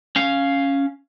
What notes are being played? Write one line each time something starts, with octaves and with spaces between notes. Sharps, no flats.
C#4 F5